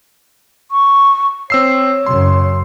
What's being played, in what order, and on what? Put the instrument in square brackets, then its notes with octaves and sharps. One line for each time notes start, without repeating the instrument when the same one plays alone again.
[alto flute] C#6
[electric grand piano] C4 E6 C7 [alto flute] C#5
[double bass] F#2 C#3 [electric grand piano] C6